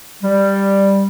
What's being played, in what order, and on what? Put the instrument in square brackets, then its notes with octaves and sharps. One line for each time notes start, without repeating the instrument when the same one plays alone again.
[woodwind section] G3